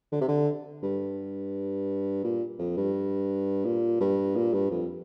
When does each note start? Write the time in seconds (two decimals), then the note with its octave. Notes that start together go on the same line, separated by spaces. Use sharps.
0.12 D3
0.21 C3
0.28 D3
0.83 G2
2.24 A#2
2.59 F2
2.77 G2
3.65 A#2
4.00 G2
4.36 A#2
4.53 G2
4.71 F2